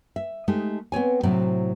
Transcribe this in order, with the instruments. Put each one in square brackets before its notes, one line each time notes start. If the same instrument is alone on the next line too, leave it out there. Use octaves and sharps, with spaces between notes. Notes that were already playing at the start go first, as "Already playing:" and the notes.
[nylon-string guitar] E5
G#3 A3 D#4 G4
B3 C4 C#5 G#5
A2 C3 F#3 C4 E4 F#4